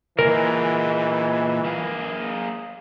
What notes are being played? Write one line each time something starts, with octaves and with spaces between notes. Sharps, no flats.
A#2 E3 G#3 A#4
A#3 G#4